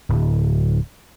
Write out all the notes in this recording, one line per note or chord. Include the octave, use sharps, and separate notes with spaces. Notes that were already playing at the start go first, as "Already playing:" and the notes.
D1